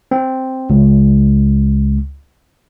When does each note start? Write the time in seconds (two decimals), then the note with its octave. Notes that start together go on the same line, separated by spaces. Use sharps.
0.11 C4
0.70 C#2